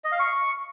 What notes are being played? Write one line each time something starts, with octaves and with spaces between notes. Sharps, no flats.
D#5
F5
C#6